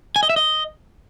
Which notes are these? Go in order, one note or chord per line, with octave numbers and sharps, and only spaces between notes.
G#5
D#5
E5
D#5